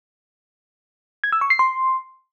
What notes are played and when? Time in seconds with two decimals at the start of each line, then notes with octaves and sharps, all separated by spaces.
1.24 G#6
1.32 E6
1.41 C#6
1.50 C7
1.59 C6